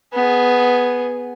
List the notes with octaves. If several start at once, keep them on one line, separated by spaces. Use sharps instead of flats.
B3 G#4